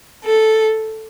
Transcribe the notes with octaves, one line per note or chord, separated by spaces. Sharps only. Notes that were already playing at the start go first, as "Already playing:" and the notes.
A4